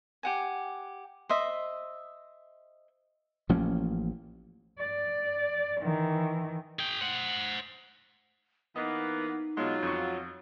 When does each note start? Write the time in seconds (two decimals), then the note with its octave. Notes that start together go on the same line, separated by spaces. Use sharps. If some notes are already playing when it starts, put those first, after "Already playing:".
0.23 G4 F#5 G#5
1.29 C5 D#5 E5
3.49 A1 F3 A#3 C#4
4.79 D5
5.82 D#3 E3
6.79 G#4 G5
7.01 C5 F#5
8.76 E3 A#3 B3 D#4 D#5
9.57 B2 F#3 G#3 F4
9.83 F2 C#6